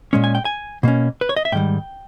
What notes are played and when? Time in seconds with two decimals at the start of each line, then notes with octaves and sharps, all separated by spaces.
0.13 A#2 G#3 C#4
0.24 G#5
0.35 G5
0.45 G#5
0.83 B2 A#3 C#4
1.21 B4
1.29 C#5
1.36 D#5
1.45 E5
1.52 G#2 D#3 G3 G5